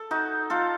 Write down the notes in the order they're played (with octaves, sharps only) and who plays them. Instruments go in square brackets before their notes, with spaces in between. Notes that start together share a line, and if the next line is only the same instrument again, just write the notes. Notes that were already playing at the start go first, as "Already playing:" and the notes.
Already playing: [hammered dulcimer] A4
D#4 F#4
F4 A4